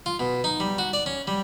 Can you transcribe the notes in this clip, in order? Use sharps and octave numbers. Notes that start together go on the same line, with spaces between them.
F4
B2
D#4
G3
F#4
D5
C#4
G3